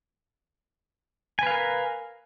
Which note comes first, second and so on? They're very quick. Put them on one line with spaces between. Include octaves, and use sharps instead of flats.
G#5 B4 F5 A#4